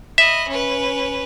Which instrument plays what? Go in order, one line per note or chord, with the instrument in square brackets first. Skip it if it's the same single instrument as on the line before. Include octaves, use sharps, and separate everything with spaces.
[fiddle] D#5 B5 [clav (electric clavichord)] E5
[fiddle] C#4 B4